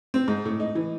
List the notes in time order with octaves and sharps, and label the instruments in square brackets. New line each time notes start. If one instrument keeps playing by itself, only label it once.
[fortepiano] C4
G#2
A2
D#4
E3